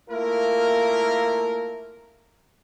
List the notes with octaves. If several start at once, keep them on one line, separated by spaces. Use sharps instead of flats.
A3 A#3 E4 F4 A#4